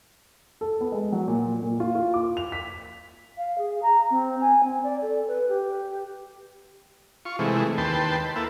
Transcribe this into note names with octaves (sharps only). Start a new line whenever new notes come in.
A4
B3
G#3
F#3
A#2
A#2
F4
F4
D6
F7
B6
F5
G#4
A#5
C4
G#5
C4
D5
A4
B4
G4
F4 C#6
C3 E3 G#3 A3
D#2 B4 G5 A5 C6
A#3 E4 A4 B4